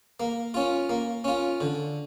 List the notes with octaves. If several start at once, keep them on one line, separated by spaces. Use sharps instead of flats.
A#3
C#4 F4
A#3
C#4 F4
D3